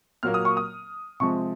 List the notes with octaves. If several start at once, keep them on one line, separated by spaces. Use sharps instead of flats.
A#2 F#3 A#3 F6
D#6
C#6
D#6
C3 F3 G#3 C#6